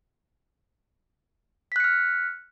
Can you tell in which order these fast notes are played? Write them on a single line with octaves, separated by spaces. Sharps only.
B6 F#6 C#7 F6